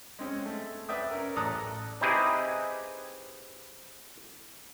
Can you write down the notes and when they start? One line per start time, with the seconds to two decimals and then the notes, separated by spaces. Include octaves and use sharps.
0.19 G#3 C4 C#4
0.46 A3
0.89 B4 D5 E5 G5 D#6
1.11 C#4 A#4
1.36 A1 A4 D5 A#5 D#6 F#6
2.01 C4 D#4 E4 G4 G#4 B4